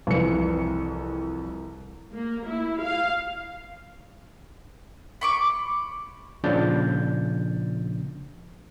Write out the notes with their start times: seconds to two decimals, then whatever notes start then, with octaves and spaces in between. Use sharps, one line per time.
0.07 C2 F2 E3 C#7
2.14 A#3
2.47 E4
2.82 F5
5.21 B5 C#6 D6
6.44 A#2 C#3 F3 D4 G6 A6